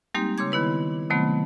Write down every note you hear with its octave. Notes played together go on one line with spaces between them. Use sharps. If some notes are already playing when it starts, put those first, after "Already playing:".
G3 G#3 A#3 C4 D#4 G4
C#3 C#5 C6 D6 G#6
D#3 B3 E4 B4
C3 D#3 F#3 A3 B3 C4